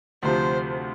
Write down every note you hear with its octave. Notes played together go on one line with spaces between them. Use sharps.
D2 C3 F3 C5